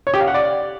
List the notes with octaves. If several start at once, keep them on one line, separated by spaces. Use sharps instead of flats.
C#5
G4
F5
F#5
D5